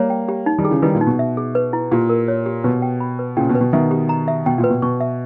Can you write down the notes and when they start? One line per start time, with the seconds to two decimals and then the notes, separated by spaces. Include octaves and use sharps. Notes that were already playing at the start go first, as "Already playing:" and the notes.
Already playing: G3 A#3 C#5
0.10 G5
0.29 G4
0.46 D#4
0.58 D#3 G3
0.65 G#4
0.70 C#3 E3
0.82 D#3 G3 B4
0.95 A#2
1.01 D#4
1.07 B2
1.19 E5
1.37 G#4
1.55 B4
1.73 E4
1.91 A#2 G4
2.10 A#4
2.28 C#5
2.46 G4
2.64 B2 B4
2.82 G5
3.00 B5
3.19 B4
3.37 A#2 C#3 G5
3.49 B2
3.55 B4
3.61 B2
3.73 B2 D#3 E5
3.91 G4
4.09 A#5
4.28 E5
4.46 B2 G5
4.58 A#2
4.64 B4
4.70 B2
4.82 B2 C#6
5.00 E5